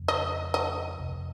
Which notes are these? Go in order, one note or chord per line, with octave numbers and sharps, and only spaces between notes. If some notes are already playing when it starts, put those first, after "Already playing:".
Already playing: F2 C#3 A3
D#5
D#5
F2 C3 F3